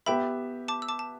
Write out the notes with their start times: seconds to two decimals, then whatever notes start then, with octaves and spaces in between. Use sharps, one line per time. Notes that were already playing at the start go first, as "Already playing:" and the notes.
0.06 B3 G4 E5 G5 B5
0.68 A5 D6
0.82 E6
0.88 A5 D6
0.99 A5